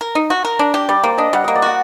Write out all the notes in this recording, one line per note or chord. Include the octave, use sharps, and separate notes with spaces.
A#4
D#4
F#4
A#4
D4
G4
G3 D5
A#3 C5
D4 D#5
G3 F#5
A#3 D#5
D5
F#4 F#5